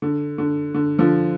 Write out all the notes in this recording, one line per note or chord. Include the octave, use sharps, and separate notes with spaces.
D3
D3
D3
D3 F3